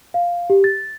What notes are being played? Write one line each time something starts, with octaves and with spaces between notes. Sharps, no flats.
F5
G4
A6